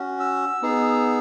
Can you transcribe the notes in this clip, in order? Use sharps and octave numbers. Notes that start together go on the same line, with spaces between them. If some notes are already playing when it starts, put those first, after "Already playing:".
Already playing: C#4 F#4
E6
B3 D#4 G#4